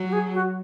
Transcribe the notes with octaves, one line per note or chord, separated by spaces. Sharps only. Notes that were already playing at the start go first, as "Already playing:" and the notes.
Already playing: F#3
F#4
G#4
F#4